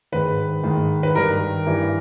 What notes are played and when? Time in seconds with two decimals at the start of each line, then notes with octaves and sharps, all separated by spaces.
0.12 G#2 D#3 B4
0.63 G#2 D#3
1.03 B4
1.15 G2 D#3 A#4
1.67 G2 E3